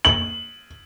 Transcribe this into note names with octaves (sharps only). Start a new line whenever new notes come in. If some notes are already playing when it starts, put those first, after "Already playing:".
F#7